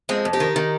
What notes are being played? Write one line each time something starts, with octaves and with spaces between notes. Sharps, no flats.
F2 G#3 C4
F2
D#4 G4
D#3
D#3